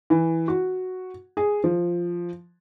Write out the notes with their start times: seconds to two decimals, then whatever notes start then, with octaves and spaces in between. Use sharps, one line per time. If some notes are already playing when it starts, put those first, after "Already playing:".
0.10 E3
0.48 F#4
1.37 G#4
1.64 F3